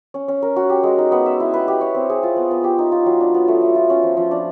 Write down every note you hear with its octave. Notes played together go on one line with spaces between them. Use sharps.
C#4
C#4
A#4
F#4
G4
G#3
D#4
B3
E5
E4
B4
G4
C#5
C4
G#4
F4
B3
B3
G4
D#4
F4
F#3
D4
B3
A3
A3
F4
C#4
F3
F3
D4